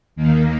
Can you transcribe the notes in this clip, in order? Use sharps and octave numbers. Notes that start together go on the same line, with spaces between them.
D#2 D#3 A#3